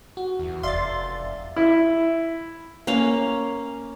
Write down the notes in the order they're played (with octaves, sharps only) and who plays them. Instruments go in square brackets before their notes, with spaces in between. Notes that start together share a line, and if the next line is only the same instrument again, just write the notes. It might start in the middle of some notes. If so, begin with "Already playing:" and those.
[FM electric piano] F#4
[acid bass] E2
[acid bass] F1 [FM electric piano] D5 E5 F5 [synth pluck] C6 A6
[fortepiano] E4
[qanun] A#3 C#4 F5